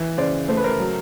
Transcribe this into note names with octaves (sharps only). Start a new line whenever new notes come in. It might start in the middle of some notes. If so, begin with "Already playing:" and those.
Already playing: E3
C#3 C5 D5
A3 C5
B4
A#4 C5
F#3